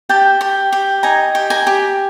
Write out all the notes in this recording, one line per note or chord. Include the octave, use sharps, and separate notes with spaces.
G4 G5 A5
G4
G4
D#4 G#5 A#5
G4
G#5 A#5
G4